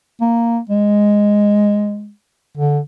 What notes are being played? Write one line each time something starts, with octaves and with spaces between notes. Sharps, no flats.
A#3
G#3
D3